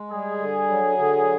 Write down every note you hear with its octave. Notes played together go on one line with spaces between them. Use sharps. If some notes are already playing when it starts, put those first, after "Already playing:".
Already playing: G#3
G3 G#4
D3
F#3
D3